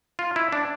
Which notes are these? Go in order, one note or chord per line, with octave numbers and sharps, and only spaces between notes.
F4
E4
D4